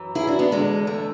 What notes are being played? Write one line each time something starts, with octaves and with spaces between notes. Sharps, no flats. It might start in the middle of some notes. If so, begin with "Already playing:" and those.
Already playing: F#2 E3
E4 G#4
D4 F#4
B3 D4
E2 D3 G#3
A3